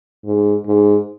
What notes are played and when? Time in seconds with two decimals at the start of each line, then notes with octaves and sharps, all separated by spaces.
0.25 G#2
0.66 G#2